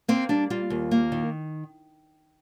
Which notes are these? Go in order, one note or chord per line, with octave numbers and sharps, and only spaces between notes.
A#3 C4
G3 D4
G3 F4
D#2
A#3
D#3